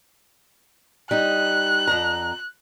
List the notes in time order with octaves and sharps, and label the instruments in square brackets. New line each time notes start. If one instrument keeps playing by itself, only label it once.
[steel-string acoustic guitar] G3 D#4 [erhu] F#6
[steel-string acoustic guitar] F2 G#2 A#5